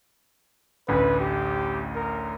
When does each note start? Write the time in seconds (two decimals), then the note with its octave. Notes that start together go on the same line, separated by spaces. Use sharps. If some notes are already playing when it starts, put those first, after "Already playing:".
0.88 A1 D2 B4
1.20 G4
1.95 A#4